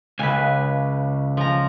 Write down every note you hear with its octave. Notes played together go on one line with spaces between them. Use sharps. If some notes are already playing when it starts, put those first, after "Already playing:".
C#2 B4 G#5
F3 A#5